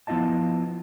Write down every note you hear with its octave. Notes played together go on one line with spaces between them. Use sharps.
F3 B3 E4 F4 D#5 A5